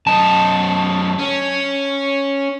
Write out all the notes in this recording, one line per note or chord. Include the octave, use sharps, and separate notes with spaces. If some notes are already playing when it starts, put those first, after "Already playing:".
F#2 D#4 A5
C#4